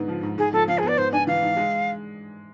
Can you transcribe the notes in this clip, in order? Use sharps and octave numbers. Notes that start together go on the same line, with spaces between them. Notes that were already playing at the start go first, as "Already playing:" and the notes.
Already playing: G#2 D3 B3
F3
G#2
G#2 G#4
F3 A4
F3 F5
G#4
B3 D5
G#2 C5
D4 G#5
E3 F5
G#2
G#3